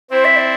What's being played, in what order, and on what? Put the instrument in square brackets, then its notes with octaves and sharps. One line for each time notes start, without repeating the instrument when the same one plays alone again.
[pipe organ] C4 E4 [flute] C5
[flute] E5
D5